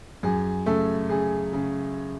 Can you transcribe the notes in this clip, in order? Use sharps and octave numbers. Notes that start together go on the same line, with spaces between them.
F#2 G#4
C#3 A3 A4
C#3 G#4
C#3